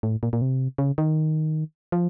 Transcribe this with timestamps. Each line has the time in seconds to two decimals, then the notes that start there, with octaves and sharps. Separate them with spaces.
0.03 A2
0.23 A#2
0.33 A#2
0.42 C3
0.78 C#3
0.98 D#3
1.92 F3